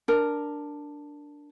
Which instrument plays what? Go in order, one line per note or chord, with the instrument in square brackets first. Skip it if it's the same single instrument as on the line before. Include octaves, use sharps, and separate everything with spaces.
[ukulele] D4 A#4